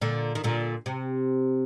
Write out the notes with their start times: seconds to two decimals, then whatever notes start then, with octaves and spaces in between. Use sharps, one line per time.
0.01 A#2 D3
0.35 D#3
0.44 A#2 D3
0.86 C3